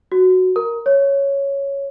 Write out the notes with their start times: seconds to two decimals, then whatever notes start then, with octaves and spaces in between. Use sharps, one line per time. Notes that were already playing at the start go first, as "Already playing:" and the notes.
0.12 F#4
0.56 A#4
0.86 C#5